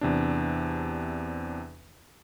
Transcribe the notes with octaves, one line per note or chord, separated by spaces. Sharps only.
E2 C3 D4